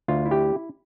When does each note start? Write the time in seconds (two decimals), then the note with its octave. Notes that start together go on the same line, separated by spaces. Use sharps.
0.08 D2 F4
0.26 E4
0.31 G4